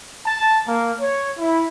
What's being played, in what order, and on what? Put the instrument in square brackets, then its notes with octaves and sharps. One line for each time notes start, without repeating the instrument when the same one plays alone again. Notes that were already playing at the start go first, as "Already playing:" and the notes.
[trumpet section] A5
A#3
C#5
E4